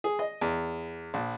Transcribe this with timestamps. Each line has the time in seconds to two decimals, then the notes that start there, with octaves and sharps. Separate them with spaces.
0.04 G#4
0.19 D#5
0.41 E2
1.14 A#1